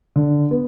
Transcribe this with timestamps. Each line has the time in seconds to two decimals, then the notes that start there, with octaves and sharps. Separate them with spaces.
0.16 D3
0.51 B3